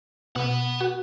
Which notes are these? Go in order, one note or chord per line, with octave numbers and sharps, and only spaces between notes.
B2 B4 F#5
F#4